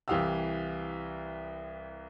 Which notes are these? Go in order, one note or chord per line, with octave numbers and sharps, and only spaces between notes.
C2 E3 G4 F5 D#6 E6